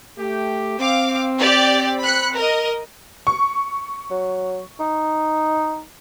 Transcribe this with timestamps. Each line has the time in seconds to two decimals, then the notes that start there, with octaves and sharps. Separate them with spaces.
0.17 A3 G4
0.79 C4 F5 D6
1.40 G4 D5
2.02 B5 F#6 C#7
2.37 A#4 D#5
3.27 C#6
4.11 F#3
4.80 D#4